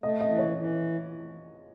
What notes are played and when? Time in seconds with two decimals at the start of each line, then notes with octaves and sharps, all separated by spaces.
0.03 A3 D#5
0.21 D#5
0.29 E3
0.39 C#5
0.57 E3